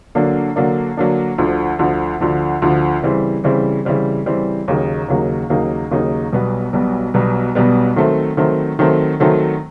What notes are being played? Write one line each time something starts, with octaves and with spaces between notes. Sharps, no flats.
D3 F#3 A#3 D4
D3 F#3 A#3 D4
D3 F#3 A#3 D4
D2 D3 F3
D2 D3 F3
D2 D3 F3
D2 D3 F3
C#3 E3 G3 C4
C#3 E3 G3 C4
C#3 E3 G3 C4
C#3 E3 G3 C4
D#2 C#3 F#3 A#3 D#4
D#2 C#3 F#3 A#3 D#4
D#2 C#3 F#3 A#3 D#4
D#2 C#3 F#3 A#3 D#4
B1 B2 G3 B3
B1 B2 G3 B3
B1 B2 G3 B3
B1 B2 G3 B3
D#3 F#3 A3 C4
D#3 F#3 A3 C4
D#3 F#3 A3 C4
D#3 F#3 A3 C4